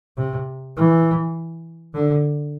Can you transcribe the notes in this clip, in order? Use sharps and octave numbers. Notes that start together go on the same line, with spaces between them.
C3
E3
D3